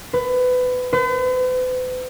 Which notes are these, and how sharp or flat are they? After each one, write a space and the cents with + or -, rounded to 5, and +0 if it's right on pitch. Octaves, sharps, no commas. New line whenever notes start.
B4 +25
B4 +45